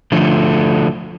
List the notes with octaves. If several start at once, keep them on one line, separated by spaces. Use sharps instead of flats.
D3 F3 A3